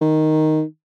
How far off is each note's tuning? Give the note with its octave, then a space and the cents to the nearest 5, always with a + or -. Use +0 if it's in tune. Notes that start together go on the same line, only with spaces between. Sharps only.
D#3 +0